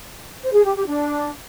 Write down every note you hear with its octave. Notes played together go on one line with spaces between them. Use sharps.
C5
G#4
G4
G4
D4